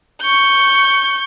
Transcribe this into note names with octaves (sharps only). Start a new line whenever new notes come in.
C#6 G6